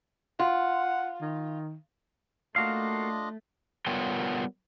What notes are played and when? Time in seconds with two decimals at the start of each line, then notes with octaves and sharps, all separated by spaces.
0.40 F4 F#5
1.21 D#3
2.56 A3 A#3 D4 F4 F#4 D#5 F5
3.87 G3 B3 F4 A#4 C#5 G5